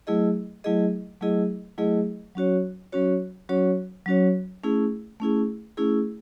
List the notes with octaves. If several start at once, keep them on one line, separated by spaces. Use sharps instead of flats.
F#3 A3 E4 G#4 D#5
F#3 A3 E4 G#4 D#5
F#3 A3 E4 G#4 D#5
F#3 A3 E4 G#4 D#5
F#3 C#4 F#4 C#5
F#3 C#4 F#4 C#5
F#3 C#4 F#4 C#5
F#3 C#4 F#4 C#5
A3 C#4 E4 G#4
A3 C#4 E4 G#4
A3 C#4 E4 G#4